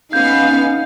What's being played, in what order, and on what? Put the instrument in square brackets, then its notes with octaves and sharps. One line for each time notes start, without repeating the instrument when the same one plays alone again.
[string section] B3 F5 [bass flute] C#4 [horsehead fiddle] D#4 [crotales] G6